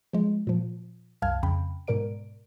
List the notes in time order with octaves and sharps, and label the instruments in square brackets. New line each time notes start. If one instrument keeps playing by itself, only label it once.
[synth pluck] F3 G#3
A#2 F3
C2 F#2 F5 A5 F6 G#6
F2 C#3 G5 B5
G#2 B2 A#4 D5 D7